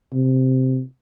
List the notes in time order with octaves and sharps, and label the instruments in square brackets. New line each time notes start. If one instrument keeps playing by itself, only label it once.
[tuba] C3